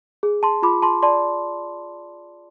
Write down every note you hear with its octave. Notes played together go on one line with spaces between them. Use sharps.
G#4
A5 C6
F4 B5 D6
A5 C6
D5 A5 C6